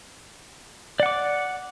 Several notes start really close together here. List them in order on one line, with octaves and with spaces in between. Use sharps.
D5 F#5 D6